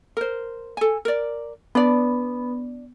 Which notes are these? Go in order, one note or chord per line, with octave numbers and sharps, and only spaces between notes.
A#4 C5
A4 G#5
A#4 D5
B3 D4 D5